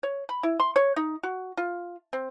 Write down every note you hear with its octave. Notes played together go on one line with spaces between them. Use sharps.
C#5
B5
E4
C6
C#5
D#4
F#4
F4
C4